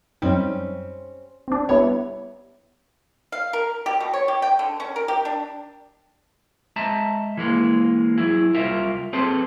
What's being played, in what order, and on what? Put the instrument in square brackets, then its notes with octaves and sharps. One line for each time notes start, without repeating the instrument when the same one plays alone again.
[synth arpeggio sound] F#2 D#4 [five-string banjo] G3 C4 C#4
[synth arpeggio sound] C4 D4
[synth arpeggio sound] G3 B3 E4 [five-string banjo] C#5
[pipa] F5
A#4
G4
B2
C#5
G4
G5
D3
C#4
A#4
G4
D4
[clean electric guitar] G#3 E5 A5 A#5
E3 G#3 A#3
F#3 E4 G#4
C2 G3 F4 A#4 E5
C4 G#4 A4 B4 C5